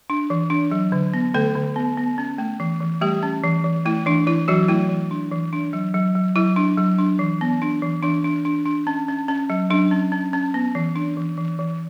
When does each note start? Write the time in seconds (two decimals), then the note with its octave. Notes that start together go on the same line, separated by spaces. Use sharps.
0.10 D4
0.30 E3
0.50 D4
0.72 F#3
0.92 D3
1.14 B3
1.34 D3 A3 A4
1.56 D3
1.76 B3
1.97 B3
2.18 C#4
2.38 A3
2.60 E3
2.80 E3
3.01 G3 A3 G4
3.23 C#4
3.44 E3
3.64 E3
3.85 A3 E4
4.06 E3 D4
4.27 E3 E4
4.48 E3 F#3 F#4
4.68 A3 E4
4.89 E3
5.11 D4
5.31 E3
5.53 D4
5.73 F#3
5.94 F#3
6.15 F#3
6.36 F#3 E4
6.56 D4
6.78 F#3
6.98 D4
7.19 E3
7.41 B3
7.62 D4
7.82 E3
8.03 E3 D4
8.24 D4
8.45 D4
8.65 D4
8.87 C#4
9.08 C#4
9.28 C#4
9.50 F#3
9.70 F#3 D4
9.91 C#4
10.12 C#4
10.33 C#4
10.54 B3
10.75 E3
10.96 D4
11.17 E3
11.37 E3
11.59 E3